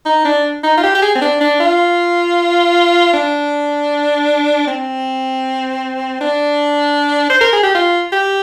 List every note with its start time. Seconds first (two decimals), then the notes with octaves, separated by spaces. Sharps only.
0.06 D#4
0.25 D4
0.63 D#4
0.77 F4
0.83 G4
0.95 G4
1.02 G#4
1.15 C4
1.21 D4
1.40 D4
1.60 F4
3.13 D4
4.67 C4
6.21 D4
7.30 C5
7.41 A#4
7.53 G#4
7.63 G4
7.75 F4
8.12 G4